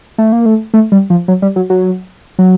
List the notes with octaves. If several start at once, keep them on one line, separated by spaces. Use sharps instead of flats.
A3
A#3
A3
A3
G3
F3
F#3
G3
F#3
F#3
F#3